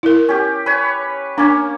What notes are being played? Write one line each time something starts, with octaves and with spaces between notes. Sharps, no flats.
E4 A#4
C#4 G4
B4 C#5
A#3 C#4 D4